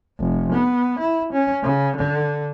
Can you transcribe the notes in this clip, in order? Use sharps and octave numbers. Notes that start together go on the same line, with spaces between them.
F1
B3
E4
C#4
C#3
D3